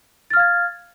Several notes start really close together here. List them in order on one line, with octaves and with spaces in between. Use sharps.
A6 F6 F5 G#6